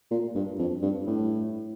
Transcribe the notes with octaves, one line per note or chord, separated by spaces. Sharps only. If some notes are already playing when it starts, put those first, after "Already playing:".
A#2
G2
F2
G2
A2